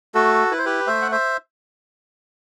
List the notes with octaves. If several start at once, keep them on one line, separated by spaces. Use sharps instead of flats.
A3 F#4 A4
E4 B4
C5
G4 B4
A3 C5 E5
F#5
C5 E5